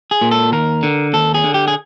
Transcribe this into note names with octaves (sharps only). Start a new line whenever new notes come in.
G#4
A#2
A4
D#2 A#4
D3
D#2 A4
G#4
D3
G4
G#4